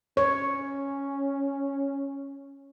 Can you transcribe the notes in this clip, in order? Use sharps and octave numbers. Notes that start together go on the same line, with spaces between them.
C#4 C#5